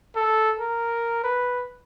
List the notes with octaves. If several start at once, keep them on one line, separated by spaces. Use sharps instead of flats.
A4
A#4
B4